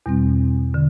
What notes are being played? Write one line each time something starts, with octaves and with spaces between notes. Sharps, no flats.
E2 B2 G3 C4
D3